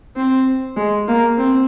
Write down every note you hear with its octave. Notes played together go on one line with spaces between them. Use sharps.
C4
G#3
A#3
C4